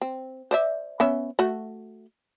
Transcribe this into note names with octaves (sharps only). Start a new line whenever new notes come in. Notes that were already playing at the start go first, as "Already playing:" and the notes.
C4
C5 D5 E5
B3 C#4 E5
A3 F#4